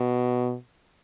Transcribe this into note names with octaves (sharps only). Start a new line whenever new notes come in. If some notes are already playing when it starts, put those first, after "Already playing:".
Already playing: B2